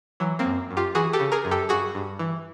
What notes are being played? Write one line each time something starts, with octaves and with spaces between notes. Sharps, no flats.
E3 F#3
A#3 C4
F#2
F#2
F4 G4
E3 F#4 G#4
G4 A4
C#3
G#4 A#4
F#2
G4 A4
G2 F#4 G#4
G2
E3